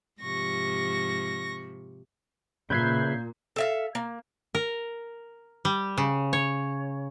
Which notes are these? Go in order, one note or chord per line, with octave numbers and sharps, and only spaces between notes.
G#2 C3 F3 C#6 A#6
A#2 C#3 B4 E5 G6 G#6 C7
A4 E5 F5
A#3
A#4
G3
C#3
C#5